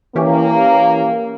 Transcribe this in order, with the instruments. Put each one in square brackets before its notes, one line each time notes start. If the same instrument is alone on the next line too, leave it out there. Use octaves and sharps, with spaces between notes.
[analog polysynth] E3 C#4 G4 [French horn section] A#3